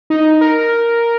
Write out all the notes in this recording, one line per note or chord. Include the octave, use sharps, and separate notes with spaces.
D#4
A#4